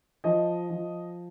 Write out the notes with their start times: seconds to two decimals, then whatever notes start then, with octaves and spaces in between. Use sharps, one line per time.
0.24 F3 D#5
0.70 F3